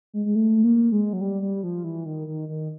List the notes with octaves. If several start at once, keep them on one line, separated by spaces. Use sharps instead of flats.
G#3
G#3
A3
A#3
G#3
F#3
G3
G3
F3
E3
D#3
D#3
D#3